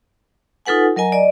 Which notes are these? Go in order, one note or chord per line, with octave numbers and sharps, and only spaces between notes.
D#4 F4 A4 B4 F#5 G#5
F#3 A#4 D#5 G#5 A#5
D5 D#5